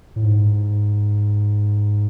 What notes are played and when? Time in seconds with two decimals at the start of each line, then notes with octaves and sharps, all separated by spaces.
0.16 A2
0.24 G#2